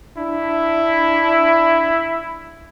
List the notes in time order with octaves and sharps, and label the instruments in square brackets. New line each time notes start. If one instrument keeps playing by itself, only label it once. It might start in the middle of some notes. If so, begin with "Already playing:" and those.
[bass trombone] D4 [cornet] E4